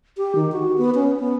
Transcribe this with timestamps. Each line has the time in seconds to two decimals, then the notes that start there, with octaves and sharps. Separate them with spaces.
0.17 G4
0.35 D#3
0.52 F#4
0.78 B3
0.95 C#4
1.20 B3